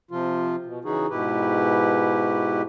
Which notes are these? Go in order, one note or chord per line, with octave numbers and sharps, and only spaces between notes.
C3 F3 F4
B2
C#3 E3 C#4 D#4 F#4 G#4
G#2 B2 E4 G4 B4